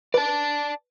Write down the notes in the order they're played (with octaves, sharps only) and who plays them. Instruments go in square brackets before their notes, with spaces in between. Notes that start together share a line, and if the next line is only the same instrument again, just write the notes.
[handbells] B4 [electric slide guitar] D5 A5